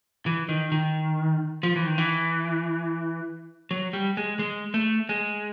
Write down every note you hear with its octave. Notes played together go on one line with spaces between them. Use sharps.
E3
D#3
D#3
F3
E3
D#3
E3
F#3
G3
G#3
G#3
A3
G#3